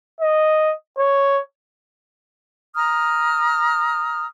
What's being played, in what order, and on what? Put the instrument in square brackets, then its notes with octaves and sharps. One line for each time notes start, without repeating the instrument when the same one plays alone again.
[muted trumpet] D#5
C#5
[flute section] A#5 D#6 F6